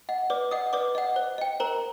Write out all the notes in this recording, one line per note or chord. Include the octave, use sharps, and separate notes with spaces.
D#5 F#5
B4 D5 D6
D#5 F#5 D#6
B4 D5 D6
D#5 F#5
C5
D#5 G5
A#4 C5 A#5